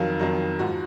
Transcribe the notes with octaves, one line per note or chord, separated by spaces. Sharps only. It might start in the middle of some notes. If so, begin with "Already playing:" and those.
Already playing: F2 D#3 F#3 F5
F2 D#3 F#3
G#2 F3 F#4